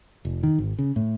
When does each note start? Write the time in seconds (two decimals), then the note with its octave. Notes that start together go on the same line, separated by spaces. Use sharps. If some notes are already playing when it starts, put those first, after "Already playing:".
0.25 F1
0.43 D#3
0.59 G#1
0.79 C#3
0.96 A2